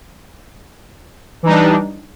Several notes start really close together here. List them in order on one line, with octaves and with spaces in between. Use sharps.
E3 D#4 G3 D4